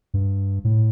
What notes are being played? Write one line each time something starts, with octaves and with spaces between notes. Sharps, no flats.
G2
A2